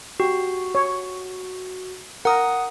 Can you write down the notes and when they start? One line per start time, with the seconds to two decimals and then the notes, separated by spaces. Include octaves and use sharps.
0.20 F#4 G4
0.75 C#5
2.25 A#4 F#5 D#6